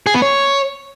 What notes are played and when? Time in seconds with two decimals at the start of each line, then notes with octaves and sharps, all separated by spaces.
0.07 G#4
0.14 B3
0.22 C#5